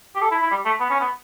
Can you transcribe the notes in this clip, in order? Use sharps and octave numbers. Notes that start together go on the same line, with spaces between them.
G4
A4
E4
E4
G3
A3
B3
C#4
B3